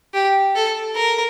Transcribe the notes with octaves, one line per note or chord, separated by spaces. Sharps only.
G4
A4
A#4